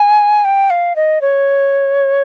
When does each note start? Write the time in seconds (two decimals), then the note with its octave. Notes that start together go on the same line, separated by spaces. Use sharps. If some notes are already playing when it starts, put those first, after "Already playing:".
Already playing: G#5
0.45 G5
0.70 F5
0.96 D#5
1.21 C#5